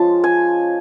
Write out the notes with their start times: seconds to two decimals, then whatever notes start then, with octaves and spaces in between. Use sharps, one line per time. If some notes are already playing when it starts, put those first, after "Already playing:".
Already playing: F3 G#3 C#4 F4 A5
0.24 G#5